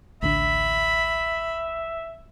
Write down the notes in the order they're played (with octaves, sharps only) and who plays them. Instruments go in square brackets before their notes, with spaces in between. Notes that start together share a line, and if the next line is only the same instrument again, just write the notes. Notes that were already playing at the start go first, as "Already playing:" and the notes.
[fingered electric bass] A1 D2 D4 [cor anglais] E5 [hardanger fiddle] B5